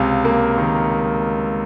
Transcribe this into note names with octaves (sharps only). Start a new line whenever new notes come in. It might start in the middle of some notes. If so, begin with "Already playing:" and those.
Already playing: C#2 C3 F5 G#5
A#3
D#3